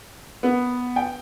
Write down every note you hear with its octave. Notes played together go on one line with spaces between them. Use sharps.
B3
G5